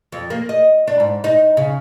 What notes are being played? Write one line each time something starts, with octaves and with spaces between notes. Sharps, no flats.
F2
A#3
D#5
D4
G#2
D#4
C#3